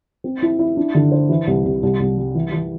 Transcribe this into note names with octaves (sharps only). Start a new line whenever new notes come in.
C4
E4
E4
D4
D3
C5
E3
C2
C2
C2
C2
G3
E3
E3